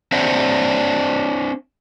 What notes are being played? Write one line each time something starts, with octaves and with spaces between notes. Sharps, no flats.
C4 D4 C5 E5 F#5